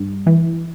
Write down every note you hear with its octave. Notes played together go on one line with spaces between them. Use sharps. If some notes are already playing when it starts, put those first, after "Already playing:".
Already playing: G2
E3